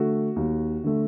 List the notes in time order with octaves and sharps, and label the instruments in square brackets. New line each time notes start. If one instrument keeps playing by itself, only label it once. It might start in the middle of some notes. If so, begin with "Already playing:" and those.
Already playing: [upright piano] D3 A3 F#4
D#2
D3 A3